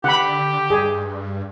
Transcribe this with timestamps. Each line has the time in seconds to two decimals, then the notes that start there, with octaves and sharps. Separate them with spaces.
0.04 D3 G4 F#5 B5
0.70 G2 G#4